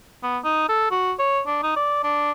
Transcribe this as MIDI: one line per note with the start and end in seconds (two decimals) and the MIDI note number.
0.23 0.38 59
0.44 0.68 63
0.69 0.89 69
0.91 1.13 66
1.19 1.41 73
1.46 1.60 62
1.63 1.72 63
1.76 2.03 74
2.03 2.32 62